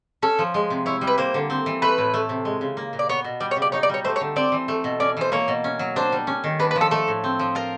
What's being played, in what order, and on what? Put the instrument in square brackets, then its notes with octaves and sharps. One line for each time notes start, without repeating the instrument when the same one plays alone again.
[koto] C#4 [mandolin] A4
[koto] F3
G#3
C3
[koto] E4 [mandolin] C#5
[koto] G3
[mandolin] B4
[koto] A#3 [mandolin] C5
[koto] D3
C4
E3
[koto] A3 [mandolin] B4
[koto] A2
A3
C3
G#3
C#3
A#3
A#2
[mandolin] D5
[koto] B3 [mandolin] C#5
[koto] B2
[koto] G3 [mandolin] D5
[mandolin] C#5
[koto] C#3
[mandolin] D5
[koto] D#4 [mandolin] C#5
[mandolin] D5
[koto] G3 [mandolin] C#5
[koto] A3 [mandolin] C5
[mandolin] C#5
[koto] D3
[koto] C4 [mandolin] D5
[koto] E3
A3
B2
[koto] C#4 [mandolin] D5
[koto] E3 [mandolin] C5
[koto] A#3 [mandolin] C#5
[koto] B2
C#4
F#3
[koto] D4 [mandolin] C5
[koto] G3
C#4
D#3
[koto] D4 [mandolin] B4
[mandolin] B4
[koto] F3
[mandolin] A4
[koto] A3 [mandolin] A4
[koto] A2
C4
F3
[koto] F4 [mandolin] A#4